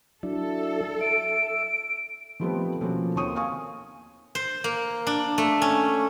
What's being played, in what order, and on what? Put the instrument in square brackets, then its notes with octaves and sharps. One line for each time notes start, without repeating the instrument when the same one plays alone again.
[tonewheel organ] F#3 D4 E4 [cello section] A4
[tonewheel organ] E5 [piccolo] D7
[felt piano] D#3 F3 G3 A3 B3 C4
B2 F3 A#3 C#4 F#4 A4
D#2 C4 C#5 C#6 D#6 D#7
F5 G#5 C#6 D#6
[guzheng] C5
A#3
D4
A3
C#4